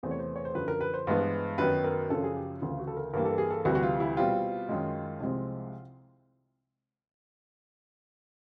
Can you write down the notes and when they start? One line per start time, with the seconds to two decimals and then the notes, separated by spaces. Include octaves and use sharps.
0.03 E2 C3 E3 A3 C5
0.11 C#5
0.19 C5
0.36 C#5
0.45 C5
0.55 F#2 D3 F3 B4
0.68 A#4
0.81 B4
0.94 C5
1.07 G2 E3 G#3 B3
1.58 F#2 D#3 F#3 B3 B4
1.84 A#4
2.10 F#2 C#3 F3 A4
2.23 G#4
2.36 G4
2.62 D2 C#3 E3 F4
2.79 F#4
2.87 A4
2.97 A#4
3.13 G2 E3 G3 A#3 A#4
3.25 A4
3.38 G#4
3.51 A4
3.65 D2 C3 E3 G3 F#4
3.75 F#4
3.83 F4
4.00 E4
4.17 B2 G3 C4 F4
4.69 F#2 D#3 G#3
5.20 C2 C3 F3 G#3 C4